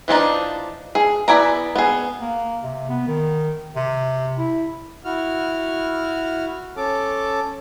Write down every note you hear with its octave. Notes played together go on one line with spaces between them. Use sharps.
E3 F3 D4 D#4
G#4
B3 E4 D5 G#5 A#5
B3 G#4
A#3
C3
B3
D#3
C3
E4
E4 F#4 F6
C#4 A4 D6